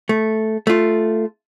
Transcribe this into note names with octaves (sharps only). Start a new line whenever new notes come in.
A3
A3 F4